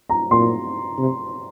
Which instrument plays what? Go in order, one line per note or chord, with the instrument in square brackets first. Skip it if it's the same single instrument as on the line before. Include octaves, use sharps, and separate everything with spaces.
[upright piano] A#5
[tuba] A#2 [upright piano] C6
[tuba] C3